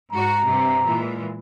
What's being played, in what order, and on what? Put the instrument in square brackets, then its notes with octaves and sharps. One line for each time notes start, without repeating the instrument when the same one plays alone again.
[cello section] G#2 F#4 [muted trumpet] A#5
[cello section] G2 C3
A#2 E3 G#3